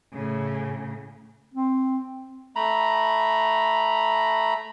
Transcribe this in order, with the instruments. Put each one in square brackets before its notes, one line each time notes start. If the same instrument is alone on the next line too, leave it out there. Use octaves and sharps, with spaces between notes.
[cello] A2 C#3
[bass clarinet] C4
[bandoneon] A3 A#5 B5